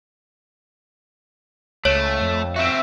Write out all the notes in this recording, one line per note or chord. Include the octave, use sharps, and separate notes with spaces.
C#2 A3 C#5
F2
C4 F#4 E5